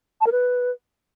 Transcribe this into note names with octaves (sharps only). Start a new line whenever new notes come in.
A5
A#4
B4